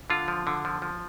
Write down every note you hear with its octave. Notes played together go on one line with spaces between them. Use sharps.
D3 F4
F3
D3
F3
F3